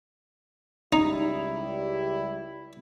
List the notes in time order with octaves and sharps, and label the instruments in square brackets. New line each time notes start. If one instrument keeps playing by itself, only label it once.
[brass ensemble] C#2 G3 E4 [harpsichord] D#4